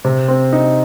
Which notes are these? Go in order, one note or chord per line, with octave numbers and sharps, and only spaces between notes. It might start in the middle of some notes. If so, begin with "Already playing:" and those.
C3
C4
D#4